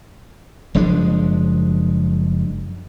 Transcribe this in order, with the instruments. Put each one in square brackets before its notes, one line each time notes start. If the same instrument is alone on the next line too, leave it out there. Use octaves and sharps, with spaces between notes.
[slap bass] F#1 F3 G#3 D4